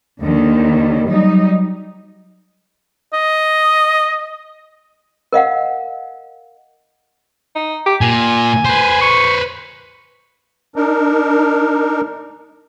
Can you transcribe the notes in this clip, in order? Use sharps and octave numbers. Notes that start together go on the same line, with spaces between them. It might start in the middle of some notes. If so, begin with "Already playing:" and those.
D#2 D3 D#3
F#3 G3 D#4
D#5
A#4 D#5 F5 F#5
D#4
G4
A#2 G#5
B4 C5
C#6
D4 D#4 A#4